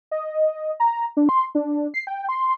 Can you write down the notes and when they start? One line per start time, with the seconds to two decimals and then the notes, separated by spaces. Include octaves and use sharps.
0.11 D#5
0.80 A#5
1.17 D4
1.29 C6
1.55 D4
1.94 C7
2.07 G5
2.29 C6